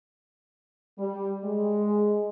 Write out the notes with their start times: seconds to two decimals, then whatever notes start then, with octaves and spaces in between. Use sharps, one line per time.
0.98 G3
1.45 G#3